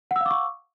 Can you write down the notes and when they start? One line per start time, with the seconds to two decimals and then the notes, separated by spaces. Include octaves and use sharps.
0.11 F#5
0.16 E6
0.21 F5
0.26 D6
0.31 C#6